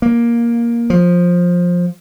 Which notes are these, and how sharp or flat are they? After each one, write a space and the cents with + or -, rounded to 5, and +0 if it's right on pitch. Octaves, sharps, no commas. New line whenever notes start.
A#3 +10
F3 +15